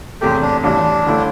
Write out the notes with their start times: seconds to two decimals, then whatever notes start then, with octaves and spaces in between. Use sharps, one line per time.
0.21 E1 E2 C3 A3 G4
0.42 D4
0.64 A1 G2 E3 D4
1.06 G1 D3 A3 E4